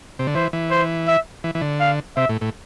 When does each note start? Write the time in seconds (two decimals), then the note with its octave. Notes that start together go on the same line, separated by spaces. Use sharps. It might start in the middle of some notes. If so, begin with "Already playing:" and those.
0.19 C3
0.27 D3
0.35 E3 C5
0.53 E3
0.71 C5
1.08 E5
1.44 E3
1.55 E3
1.61 D3
1.80 F5
2.16 C3 E5
2.29 A2
2.41 A2